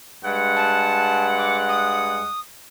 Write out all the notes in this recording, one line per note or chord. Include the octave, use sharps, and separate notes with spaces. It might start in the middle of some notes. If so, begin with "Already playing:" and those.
G2 G#3 F#5
A5
D6
D#6